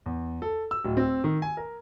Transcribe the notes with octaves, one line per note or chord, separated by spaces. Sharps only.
E2
A4
E6
D1
C4
D#3
G#5
A#4